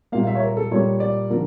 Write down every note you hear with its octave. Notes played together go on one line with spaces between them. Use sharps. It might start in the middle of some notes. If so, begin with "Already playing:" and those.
A#2 G3 A#3 F5
F5
E5
C#5
A#4
A4
A#2 G3 A#3 C#5
D5
D3 F3 A#3 A#4